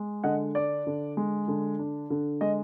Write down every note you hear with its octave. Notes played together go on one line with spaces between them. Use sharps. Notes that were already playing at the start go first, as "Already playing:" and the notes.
Already playing: G#3
D3 D#5 F#5
D4 D5
D3
G#3
D3
D4
D3
G#3 D#5